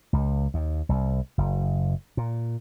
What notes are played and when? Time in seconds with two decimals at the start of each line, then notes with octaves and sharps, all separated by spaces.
0.13 C#2
0.54 D#2
0.89 C2
1.38 F#1
2.17 A#2